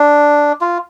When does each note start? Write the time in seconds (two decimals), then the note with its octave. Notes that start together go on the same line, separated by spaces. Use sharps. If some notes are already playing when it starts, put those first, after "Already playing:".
Already playing: D4
0.61 F4